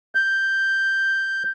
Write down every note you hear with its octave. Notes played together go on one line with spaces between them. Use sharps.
G6